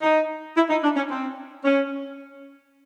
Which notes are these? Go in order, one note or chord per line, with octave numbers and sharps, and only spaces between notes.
D#4
E4
D#4
D4
C#4
C4
C#4